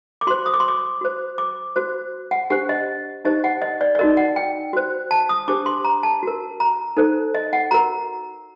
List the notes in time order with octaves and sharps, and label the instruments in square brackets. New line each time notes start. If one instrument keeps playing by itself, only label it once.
[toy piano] D6
F#4 C5 C6
D#6
D6
C6
D6
F#4 C5
D6
F#4 C5
F#5
D4 G4 C5 F#5
D#5
D#4 G4 C5 D#5
F#5
D#5
D5
D5
D#4 F#4 A#4 D#5
F#5
G5
F#4 C5
A5
D#6
D4 G4 C5 D6
C6
A#5
A5
F#4 A#4
A#5
D#4 A4 C5
D#5
F#5
F#4 A#4 A#5